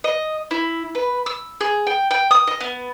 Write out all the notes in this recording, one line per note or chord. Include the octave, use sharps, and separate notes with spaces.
D#5
E4
B4
E6
G#4
G5
G5
D#6
D#5
B3